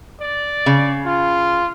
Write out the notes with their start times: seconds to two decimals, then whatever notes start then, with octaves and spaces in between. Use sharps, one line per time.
0.21 D5
0.66 C#3
1.06 F4